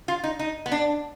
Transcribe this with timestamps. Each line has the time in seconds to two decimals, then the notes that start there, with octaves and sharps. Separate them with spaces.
0.08 F4
0.24 D#4
0.39 D#4
0.66 B3
0.72 D4